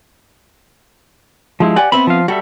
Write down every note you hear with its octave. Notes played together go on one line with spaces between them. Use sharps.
G2 F3 G#3 E4
G4 D5 F#5 G#5
B3 C4 E5 B5
F3 F5
G3 F#4 A4 E5